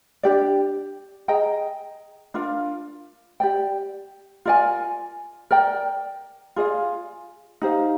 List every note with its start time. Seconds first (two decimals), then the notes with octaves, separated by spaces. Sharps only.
0.23 D4 G4 D5
1.28 G#4 D#5 G5 A#5
2.34 D4 F4 A#4 F5
3.40 G4 D5 G5
4.45 F4 A#4 D5 G#5
5.51 A#4 D5 G5
6.56 F4 G#4 D5 F5
7.62 D#4 G4 C5 F5